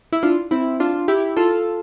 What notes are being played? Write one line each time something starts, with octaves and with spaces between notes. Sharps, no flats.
E4
D4 F4
C4 E4
D4 F4
E4 G4
F4 A4